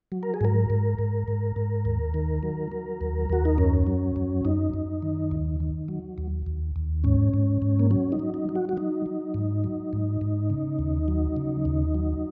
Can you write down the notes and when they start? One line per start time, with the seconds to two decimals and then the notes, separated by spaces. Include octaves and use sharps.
0.12 F#3
0.23 A#4
0.34 G#4
0.41 G#2 A#4
0.70 G#2
0.99 G#2
1.28 G#2
1.56 G#2
1.85 D#2
2.14 D#3
2.43 F#3
2.72 F#3
3.01 D#2
3.30 D#2 F#4
3.45 D#4
3.58 F#2 C#4
3.87 F#3
4.16 F#2
4.45 F#2 D#4
4.74 F#2
5.02 D#3
5.31 D#2
5.60 D#3
5.88 F#3
6.18 D#2
6.46 D#2
6.76 D#2
7.04 G#2 C#4
7.34 G#2
7.62 G#2
7.79 A#3
7.91 F#3 C#4
8.12 D#4
8.19 F#3
8.34 D#4
8.49 F#3
8.55 F#4
8.69 F#4
8.77 F#3 D#4
9.06 F#3
9.34 G#2
9.64 F#3
9.93 G#2
10.21 G#2
10.50 C#3
10.79 D#2
11.08 F#3
11.36 C#3
11.65 D#2
11.95 F#3